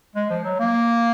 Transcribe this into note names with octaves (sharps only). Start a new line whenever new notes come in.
G#3
F3
F#3
A#3